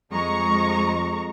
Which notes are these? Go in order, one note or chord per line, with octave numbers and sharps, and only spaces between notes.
F2 G#3 A#5 C#6